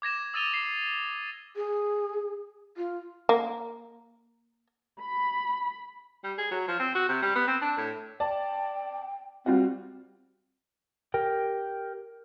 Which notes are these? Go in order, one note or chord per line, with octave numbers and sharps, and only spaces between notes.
D6 G#6 A#6 E7
D#6 E6 A6 D#7 F7 G7
C7
G#4
F4
A#3
B5
G3
G#4
F#3
F3
C4
F#4
C3
G3
B3
C4
D4
A2
D5 G5 A5
G3 C4 F4 F#4
G4 A#4 G5